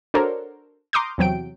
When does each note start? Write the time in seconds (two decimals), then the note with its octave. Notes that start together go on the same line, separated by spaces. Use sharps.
0.14 D4 F#4 A4 A#4 C5 C#5
0.93 A#5 C6 D6 D#6 F6 G6
1.18 E2 C3 F#3 G5 D7